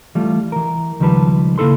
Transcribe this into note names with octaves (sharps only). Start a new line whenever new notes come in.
E3 G3 A3 F4
E3 A#4
C#2 D#3 F3 G3 B4 A5
C#3 A#3 E4 A4 C6